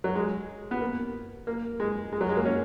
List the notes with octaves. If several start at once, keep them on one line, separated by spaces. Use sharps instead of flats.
F#3
G#3
B3
A#3
A#3
G#3
G#3
F#3
G#3
A#3
C#4